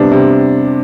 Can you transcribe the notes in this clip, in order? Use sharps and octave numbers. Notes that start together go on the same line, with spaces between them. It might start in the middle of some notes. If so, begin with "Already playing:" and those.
Already playing: C3 G3 B3 D4
C3